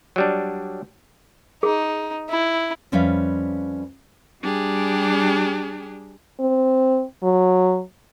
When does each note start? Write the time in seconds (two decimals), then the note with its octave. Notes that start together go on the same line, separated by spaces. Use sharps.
0.16 F#3 G3 D4
1.63 D#4 G#4
2.29 E4
2.92 F2 G3 C#4 B4 E5 F5
4.41 G3 D4 G4 G#4
6.40 C4
7.23 F#3